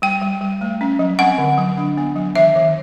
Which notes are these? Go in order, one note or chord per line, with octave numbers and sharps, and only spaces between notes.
G3 G5
G3
G3
A3
C#4
F#3
C4 F#5
D3
F#3
D4
B3
F#3
D#3 E5
D#3